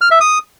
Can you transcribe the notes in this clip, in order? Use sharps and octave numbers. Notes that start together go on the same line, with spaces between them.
F6
E5
D#6